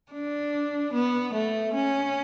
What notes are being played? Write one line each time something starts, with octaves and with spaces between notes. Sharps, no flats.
D4
B3
A3
C#4